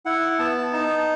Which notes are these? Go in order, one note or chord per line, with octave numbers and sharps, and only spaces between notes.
E4 F#5
B3 A5
D#4 A5